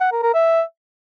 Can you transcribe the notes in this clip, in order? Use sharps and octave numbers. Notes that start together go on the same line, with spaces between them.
F#5
A#4
A#4
E5